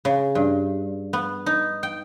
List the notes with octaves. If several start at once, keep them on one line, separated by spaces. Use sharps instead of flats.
C#3
G2
B3
D#4
G5